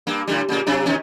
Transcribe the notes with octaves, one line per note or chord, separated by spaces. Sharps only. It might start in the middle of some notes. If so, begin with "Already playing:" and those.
G2 A#3
A2 D3 G3
A#2 C#3 A#3
C3 F#3 D4
B2 D#3 C#4